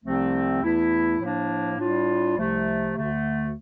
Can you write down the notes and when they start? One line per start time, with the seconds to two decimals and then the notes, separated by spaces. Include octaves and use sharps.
0.04 C2 C3 F3 A3 C4
0.62 E2 E3 A3 E4
1.20 A2 F3 A#3 D4
1.78 A2 G3 D4 F4
2.36 C2 C3 F3 A3
2.95 D2 D3 A3